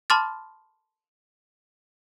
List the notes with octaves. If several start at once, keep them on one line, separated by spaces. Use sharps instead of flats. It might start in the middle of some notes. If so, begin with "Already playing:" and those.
A5 B5 C6 D6 F6 A6